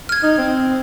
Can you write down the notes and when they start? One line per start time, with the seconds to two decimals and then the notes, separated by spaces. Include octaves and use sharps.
0.09 F6 G#6
0.23 D#4
0.38 C4